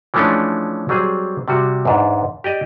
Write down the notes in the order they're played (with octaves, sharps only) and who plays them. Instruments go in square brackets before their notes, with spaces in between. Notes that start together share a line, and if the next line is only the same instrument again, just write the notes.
[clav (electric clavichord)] E3 F3 G#3 A3 C#4 D4
F#3 G3 C4 G#4
C3 G3 F#4
E2 G#2 D4
G4 D5 D#5